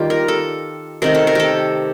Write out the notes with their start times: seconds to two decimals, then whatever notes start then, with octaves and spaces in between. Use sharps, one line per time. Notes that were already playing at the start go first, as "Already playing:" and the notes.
Already playing: D#3 G3 A#3 F4 G4
0.10 A#4
0.28 A4
1.02 C3 D#3 A3 A#4
1.15 A4
1.27 A#4
1.35 G4 A4